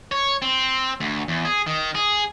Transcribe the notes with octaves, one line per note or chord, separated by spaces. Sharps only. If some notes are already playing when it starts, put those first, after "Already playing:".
C#5
C4
D2
E2
G#4
D#3
G#4